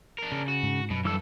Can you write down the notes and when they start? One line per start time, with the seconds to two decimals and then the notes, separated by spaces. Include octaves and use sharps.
0.18 D4 A#4
0.32 C#3
0.48 F#4
0.63 G#2
0.91 F#2 B2
1.05 G2 E3 A4 E6